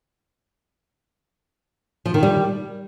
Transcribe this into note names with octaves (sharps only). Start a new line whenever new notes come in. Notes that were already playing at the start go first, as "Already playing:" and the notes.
F3
D#3
G3